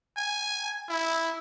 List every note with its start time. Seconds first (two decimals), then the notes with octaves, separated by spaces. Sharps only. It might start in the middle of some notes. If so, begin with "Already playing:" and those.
0.17 G#5
0.89 E4